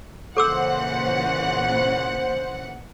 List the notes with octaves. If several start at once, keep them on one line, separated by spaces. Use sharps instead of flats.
A#2 C#3 E3 A4 C5 F#5 D6 E6